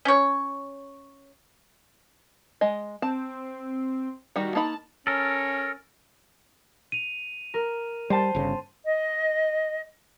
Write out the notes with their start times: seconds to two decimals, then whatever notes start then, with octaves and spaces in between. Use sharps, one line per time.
0.05 C#4 C#5
2.61 G#3 D#5
3.02 C4 A5
4.36 D#3 G3 F#4
4.55 A#3 D#4 A5 B5
5.07 C#4 A4 A#4
6.92 D#7 F7
7.54 A#4
8.10 G3 C5 G5 A5
8.35 G1 C#3
8.86 D#5